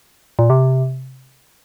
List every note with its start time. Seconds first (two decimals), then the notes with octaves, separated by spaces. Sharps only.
0.39 A#2
0.50 C3